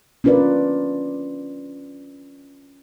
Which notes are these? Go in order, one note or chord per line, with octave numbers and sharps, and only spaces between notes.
C#4 D4 F4 A#4 B4 D5